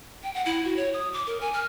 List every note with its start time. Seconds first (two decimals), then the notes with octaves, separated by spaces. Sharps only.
0.23 G5
0.34 F#5
0.46 E4
0.65 F#4
0.76 C#5
0.93 D#6
1.13 D6
1.27 A#4
1.41 G#5
1.54 F6